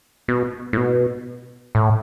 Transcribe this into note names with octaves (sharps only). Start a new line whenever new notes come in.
B2
A2
B2
A2